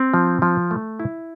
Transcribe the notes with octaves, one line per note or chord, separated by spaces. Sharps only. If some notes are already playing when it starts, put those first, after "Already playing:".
Already playing: C4
F3
F3
A3
E4